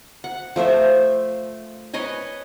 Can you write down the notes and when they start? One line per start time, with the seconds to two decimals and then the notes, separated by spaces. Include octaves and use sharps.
0.24 F#5
0.56 F3 A3 C5 E5
1.93 B4 C#5 D#5 G#5